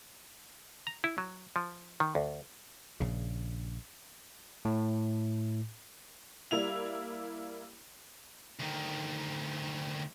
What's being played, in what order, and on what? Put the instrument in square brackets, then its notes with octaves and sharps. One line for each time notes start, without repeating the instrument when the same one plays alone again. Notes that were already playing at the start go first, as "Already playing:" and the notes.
[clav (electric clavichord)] A#5
E4
F#3
F3
D#3
D2
[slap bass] A#1 C#3
[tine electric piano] A2
[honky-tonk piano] G3 A#3 E4 F7
[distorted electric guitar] D2 D#3